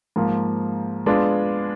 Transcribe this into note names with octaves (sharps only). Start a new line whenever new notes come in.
G#2 F3 A#3
G#3 B3 D4 F4